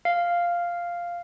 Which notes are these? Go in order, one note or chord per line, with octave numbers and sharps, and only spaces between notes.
F5